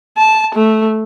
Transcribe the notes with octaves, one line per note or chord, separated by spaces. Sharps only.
A5
A3